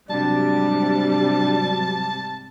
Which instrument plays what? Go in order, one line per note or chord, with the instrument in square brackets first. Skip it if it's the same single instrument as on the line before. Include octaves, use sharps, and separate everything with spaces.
[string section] G#2 C3 G3 [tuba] F#3 [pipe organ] D4 [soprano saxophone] A5